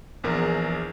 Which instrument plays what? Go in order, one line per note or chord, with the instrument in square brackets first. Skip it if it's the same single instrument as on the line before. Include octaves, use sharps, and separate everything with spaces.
[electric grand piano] A#1 E2 A#4